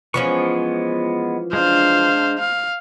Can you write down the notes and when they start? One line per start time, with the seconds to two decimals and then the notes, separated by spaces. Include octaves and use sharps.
0.14 E3 F3 G#3 B3 C#4 C#6
1.53 G#3 D4 C5 F5
2.39 F5